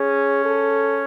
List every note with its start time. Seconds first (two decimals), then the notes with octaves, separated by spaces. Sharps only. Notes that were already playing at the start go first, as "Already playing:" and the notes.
Already playing: C#4 G#4
0.45 A4